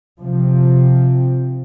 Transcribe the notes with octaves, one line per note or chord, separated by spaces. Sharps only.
C3 F3 C4